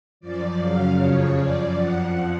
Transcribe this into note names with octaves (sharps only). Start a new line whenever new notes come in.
F#2 F3 D5
F#2 C#3 F#3 F5
F2 C#3 F3 C#5
F#2 F3 D5
F2 F3 F#5